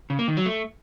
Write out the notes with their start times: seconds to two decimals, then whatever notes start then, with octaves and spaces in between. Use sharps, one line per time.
0.10 C#3
0.19 A#3
0.28 D#3
0.37 F#3
0.46 A3